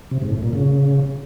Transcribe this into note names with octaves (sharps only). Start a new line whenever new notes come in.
C3
G#2
A2
A#2
C#3